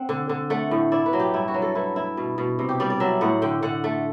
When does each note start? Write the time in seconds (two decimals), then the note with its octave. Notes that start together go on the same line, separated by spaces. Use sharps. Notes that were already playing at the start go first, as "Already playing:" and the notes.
Already playing: C4 F#5
0.09 D3
0.29 D3
0.50 A3 F#5
0.71 A2
0.92 E4 D5
1.06 B4
1.13 F#3
1.20 G4
1.34 G2 E4
1.48 F#4
1.54 F#3
1.62 A4
1.75 E4 B4
1.96 E4
2.17 B2
2.38 B2
2.59 C3
2.69 G4
2.80 G3 D5
2.90 D5
3.00 F#3 E5
3.21 A2 F#5
3.42 D3 G5
3.62 D3 F#5
3.84 A3